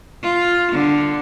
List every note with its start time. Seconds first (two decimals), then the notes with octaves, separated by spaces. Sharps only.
0.23 F4
0.72 D3